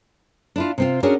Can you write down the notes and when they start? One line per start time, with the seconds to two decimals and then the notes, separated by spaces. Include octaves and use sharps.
0.56 D4 E4 F4
0.78 C3 C4 F4
1.03 C#4 D4 F#4 G#4 A#4 C#5